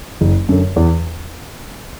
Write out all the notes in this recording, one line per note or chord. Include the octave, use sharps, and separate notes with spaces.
F#1
F#2 D3
E2